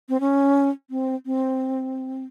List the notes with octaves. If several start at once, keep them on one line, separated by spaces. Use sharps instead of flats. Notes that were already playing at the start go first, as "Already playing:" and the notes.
C4
C#4
C4
C4